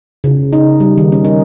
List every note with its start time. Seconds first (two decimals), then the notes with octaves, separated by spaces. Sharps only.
0.24 C#3
0.53 D#4
0.80 G3
0.98 D#3
1.12 C#4
1.25 D#4